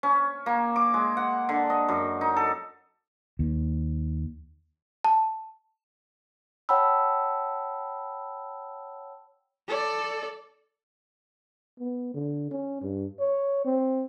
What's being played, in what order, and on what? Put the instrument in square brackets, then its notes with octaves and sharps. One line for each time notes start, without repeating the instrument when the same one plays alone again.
[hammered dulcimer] C#4
A#3
D6
G#3
F#5
D3
D#5
F#2
D#4
A4
[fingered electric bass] D#2
[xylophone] A5
[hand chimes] C#5 F#5 G5 A5 B5 E6
[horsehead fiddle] A4 D5
[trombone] B3
D3
C#4
G2
C#5
C4